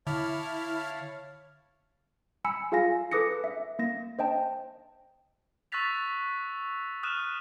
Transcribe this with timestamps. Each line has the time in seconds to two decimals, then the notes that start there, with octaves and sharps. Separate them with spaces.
0.07 D3 E4 C#5 F5 A5 F6
2.45 G#5 B5 E6 C#7
2.72 F4 G#4 F5 G#5 A#6
3.12 A4 B4 D6 D#6 A#6 C#7
3.44 E5
3.79 A#3 A#6
4.19 C5 D#5 G5 A5
5.72 C#6 E6 F#6 A6 B6 F7
7.03 D#6 F6 F#6 D#7 E7